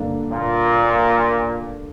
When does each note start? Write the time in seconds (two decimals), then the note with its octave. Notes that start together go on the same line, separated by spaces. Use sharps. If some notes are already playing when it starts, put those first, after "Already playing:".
Already playing: G2 D3 A#3 D4
0.31 A#2